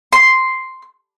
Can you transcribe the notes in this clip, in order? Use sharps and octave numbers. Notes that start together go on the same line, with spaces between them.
C6